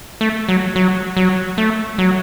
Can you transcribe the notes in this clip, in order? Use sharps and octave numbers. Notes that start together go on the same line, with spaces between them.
A3
F#3
F#3
F#3
A3
F#3